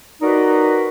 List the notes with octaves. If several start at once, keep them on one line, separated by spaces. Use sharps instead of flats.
D#4 F#4 A#4 B4 D5